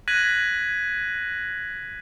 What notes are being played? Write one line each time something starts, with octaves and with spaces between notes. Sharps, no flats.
F#6 G#6 A#6 B6 D#7 F#7